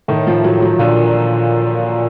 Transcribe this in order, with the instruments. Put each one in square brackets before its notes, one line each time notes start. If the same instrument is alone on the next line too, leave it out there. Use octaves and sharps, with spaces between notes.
[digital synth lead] A2 [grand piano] D#3
[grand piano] F3
F#3
F#3
[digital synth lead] A#2 [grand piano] D3